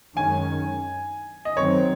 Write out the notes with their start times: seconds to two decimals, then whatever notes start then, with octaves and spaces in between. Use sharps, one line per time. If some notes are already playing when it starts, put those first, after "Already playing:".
0.16 F#2 D#3 G#3 C#4 G#5
1.45 D#5
1.56 F#2 D#3 F#3 C4 C#5